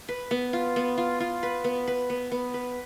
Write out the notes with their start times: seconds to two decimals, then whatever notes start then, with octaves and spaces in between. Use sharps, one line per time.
0.09 B4
0.31 B3
0.53 F4
0.76 B3
0.98 F4
1.20 F4
1.43 B4
1.64 B3
1.88 B4
2.10 B3
2.31 B3
2.54 B4